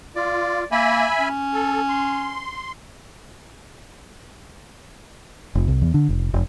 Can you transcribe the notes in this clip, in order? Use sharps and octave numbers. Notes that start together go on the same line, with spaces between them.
F4 D5
A#3 E5 G#5 B5
C#4
A4
C6
F1
C2
E2
D3
F1
F1